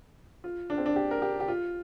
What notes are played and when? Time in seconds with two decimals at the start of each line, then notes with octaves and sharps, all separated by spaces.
0.44 F4
0.70 D4
0.78 C4
0.86 D4
0.96 G4
1.11 A#4
1.22 G4
1.40 G4
1.48 F4